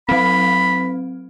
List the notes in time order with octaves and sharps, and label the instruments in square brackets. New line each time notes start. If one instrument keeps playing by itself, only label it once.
[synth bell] F#3 C4 [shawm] B5